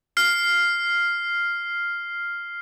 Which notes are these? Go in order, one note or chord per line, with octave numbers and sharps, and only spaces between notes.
F6 C7